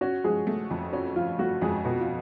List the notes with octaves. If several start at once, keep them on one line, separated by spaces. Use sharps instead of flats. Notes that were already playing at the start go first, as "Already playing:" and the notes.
C#4 F#4
F3 G#3 G#4
A3
F2
C#4 F#4
F3 F4
A3 F#4
F2 G#3 G#4
B2 F#4
F4